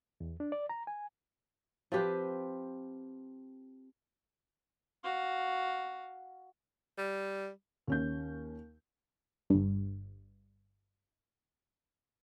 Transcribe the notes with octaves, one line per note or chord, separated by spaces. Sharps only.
E2
D4
D5
A#5
G#5
F3 C4 G4 B4
F#4 F5
G3
D#2 C#4 G6
G1 G2